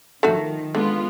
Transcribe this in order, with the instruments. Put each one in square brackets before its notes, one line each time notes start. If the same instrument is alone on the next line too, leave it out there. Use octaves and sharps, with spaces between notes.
[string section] D#3 F3 [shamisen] A3 D#4 F#4
[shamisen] D3 [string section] G#3 B3 F4